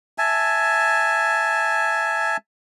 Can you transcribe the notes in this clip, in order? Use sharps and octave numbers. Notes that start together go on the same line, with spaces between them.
E5 G#5 A5